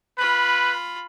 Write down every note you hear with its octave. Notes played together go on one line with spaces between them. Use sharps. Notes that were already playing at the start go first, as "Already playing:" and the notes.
F4 B4 B5